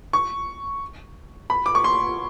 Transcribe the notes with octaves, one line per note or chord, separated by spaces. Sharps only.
C#6
B5
D6
C#6
C6